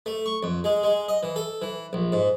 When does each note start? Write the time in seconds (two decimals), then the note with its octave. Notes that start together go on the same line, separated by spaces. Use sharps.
0.06 A3
0.26 C#6
0.43 F2
0.64 G#3
0.83 G#3
1.09 D#5
1.23 E3
1.36 A4
1.62 E3
1.93 A#1
2.12 G#2